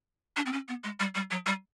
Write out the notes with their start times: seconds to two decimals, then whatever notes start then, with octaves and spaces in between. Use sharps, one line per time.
0.36 D4
0.46 C4
0.53 C#4
0.68 B3
0.84 G#3
1.00 G3
1.15 G3
1.31 F#3
1.46 G3